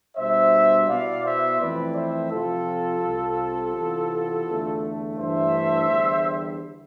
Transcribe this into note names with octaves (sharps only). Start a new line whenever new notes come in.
B2 G3 D4 C5 E5
B2 B3 E4 D5 F5
C5 E5
F2 E3 A3 C4 E4 B4 D5
C5 E5
C3 F3 C4 F4 A4
C2 C3 G3 C4
C3 E3 B3 E4
E2 D3 A3
G2 E3 A3 D4 C5 E5
E2 D3 G3